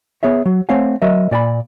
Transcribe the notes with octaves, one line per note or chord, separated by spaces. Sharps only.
B3 G#4 C#5 E5
F#3
A3 C4 C#5 F5 F#5 G#5
F#3 A#4 D#5 E5
A#2 D5 G#5 B5